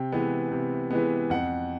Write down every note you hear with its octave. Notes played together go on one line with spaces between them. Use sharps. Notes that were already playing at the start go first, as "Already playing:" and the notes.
Already playing: C3 G5
E3 G#3 B3
C3
E3 G#3 B3
F2 F#5